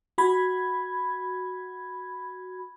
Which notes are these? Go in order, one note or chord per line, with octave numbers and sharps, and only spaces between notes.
F#4 B5 G#6